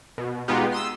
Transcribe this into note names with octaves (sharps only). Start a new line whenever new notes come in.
B2
B2 G#3 B3 D#4 F4 G4
C6 D#6 E6